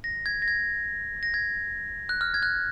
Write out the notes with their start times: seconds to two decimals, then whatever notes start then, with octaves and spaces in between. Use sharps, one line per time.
0.04 A#6
0.26 G#6
0.42 A#6
0.48 G#6
1.23 A#6
1.34 G#6
2.09 F#6
2.21 F6
2.34 G#6
2.43 F#6